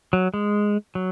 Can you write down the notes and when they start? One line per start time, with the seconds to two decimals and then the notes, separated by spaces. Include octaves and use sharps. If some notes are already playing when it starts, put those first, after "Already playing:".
0.13 F#3
0.34 G#3
0.95 F#3